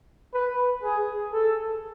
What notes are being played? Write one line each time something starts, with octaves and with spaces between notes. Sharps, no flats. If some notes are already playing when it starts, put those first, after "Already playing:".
B4
G#4
A4